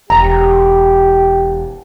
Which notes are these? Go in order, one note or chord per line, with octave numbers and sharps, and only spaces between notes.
E1 G4 A#5